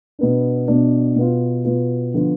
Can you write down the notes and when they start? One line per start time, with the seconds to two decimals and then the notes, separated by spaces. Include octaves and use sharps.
0.19 B2 B3 D4
0.68 B2 B3 D4
1.16 B2 B3 F4
1.65 B2 B3 F4
2.14 D3 F3 B3 F4